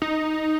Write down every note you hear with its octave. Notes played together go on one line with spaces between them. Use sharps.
D#4